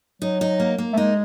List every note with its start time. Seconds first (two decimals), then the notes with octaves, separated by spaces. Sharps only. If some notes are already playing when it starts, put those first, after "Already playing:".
0.22 F#3 D#4
0.41 D#4
0.60 A#3
0.78 A#3
0.93 A3
0.97 G#3 D#4